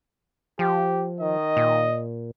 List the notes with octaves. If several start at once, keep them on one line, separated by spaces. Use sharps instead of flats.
F3 G4
D#3 D#5
A#2